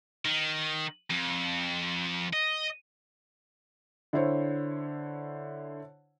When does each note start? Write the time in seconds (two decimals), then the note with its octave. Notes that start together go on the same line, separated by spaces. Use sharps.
0.25 D#3
1.10 F2
2.33 D#5
4.13 D3 E4 C5 C#5